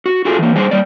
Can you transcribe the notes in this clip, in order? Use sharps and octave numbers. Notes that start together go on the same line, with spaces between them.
F#4
F4 F#4 G#4 A4
E3 A#3
G3 G#4 C5
G3 A#3 D5